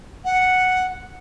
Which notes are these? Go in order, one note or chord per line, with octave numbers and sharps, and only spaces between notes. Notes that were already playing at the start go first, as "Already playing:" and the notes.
F#5